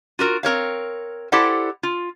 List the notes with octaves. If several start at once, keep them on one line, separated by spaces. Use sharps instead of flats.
F4 F#4 A#4
C4 A#4 C#5 F5
E4 G4 A4 C5 D5 F#5
F4